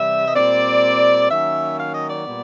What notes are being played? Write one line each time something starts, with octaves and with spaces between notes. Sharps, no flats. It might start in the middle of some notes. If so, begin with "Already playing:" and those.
Already playing: C3 E3 G3 E5
D#5
A#2 G3 C4 D5
D#3 F#3 A#3 C#4 E5
F5
D#5
D5
A#2 G3 B3